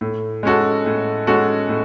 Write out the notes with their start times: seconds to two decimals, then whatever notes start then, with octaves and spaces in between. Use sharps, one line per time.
0.01 A2
0.43 G#3 C#4 F#4 A4
0.86 A2
1.27 G#3 C#4 F#4 A4
1.69 A2